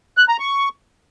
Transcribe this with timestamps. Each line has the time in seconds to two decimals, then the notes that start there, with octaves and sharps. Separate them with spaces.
0.17 F#6
0.29 A#5
0.40 C#6